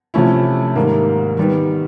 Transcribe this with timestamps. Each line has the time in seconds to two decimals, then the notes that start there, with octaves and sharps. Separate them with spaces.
0.14 C3 F3 A3 C#4 E4
0.75 G#2 D#3 G3 A#3
1.37 D#3 G3 B3